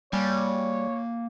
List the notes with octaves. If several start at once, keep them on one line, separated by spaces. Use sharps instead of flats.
G3 A#3 C#5 G#5